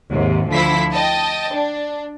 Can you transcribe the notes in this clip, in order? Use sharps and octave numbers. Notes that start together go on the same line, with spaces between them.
D#2 G#2 C3
D2 D3 F3 E4 B6
D#5 G5 A5
D4